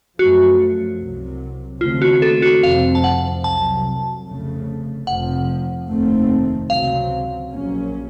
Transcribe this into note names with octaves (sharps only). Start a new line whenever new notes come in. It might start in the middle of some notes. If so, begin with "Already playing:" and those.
F#2 F3 A3 F#4
C2 C3 F#3
D#2 C#3 A3 C4 F4
F#4
A4
F#4
F1 F2 C3 F3 C4 F5
A5
F#5
C2 C3 F#3 A5
F1 F2 C#3 A3
F1 F2 C3 F3 F#5
F1 D#2 D#3 A3 C4
C#2 C3 F#3 C4 F5
A#1 A#2 F#3 A#3 C#4